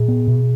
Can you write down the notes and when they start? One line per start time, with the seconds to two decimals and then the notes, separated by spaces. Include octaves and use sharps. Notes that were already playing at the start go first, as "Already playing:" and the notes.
Already playing: A#2 G#4
0.08 B3
0.28 B2